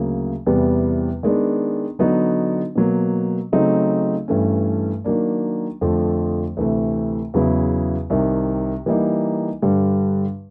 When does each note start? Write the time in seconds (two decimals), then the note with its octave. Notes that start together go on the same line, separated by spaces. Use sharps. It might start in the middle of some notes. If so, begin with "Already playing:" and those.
Already playing: D2 C#3 F#3 A#3
0.46 E2 C3 E3 G3 B3
1.23 D#3 G#3 B3 D4
1.99 D3 F#3 B3 D#4 F#4
2.75 B2 F#3 A#3
3.52 C#3 F#3 A3 C4 D#4
4.28 G2 E3 A3 C#4
5.04 D#3 F#3 A#3 D4
5.81 F2 D3 F3 A3
6.57 D2 C3 E3 A3
7.34 E2 C#3 F#3 B3 E4
8.10 C2 C3 D#3
8.86 E3 G3 A#3 D#4
9.62 G2 D3 G3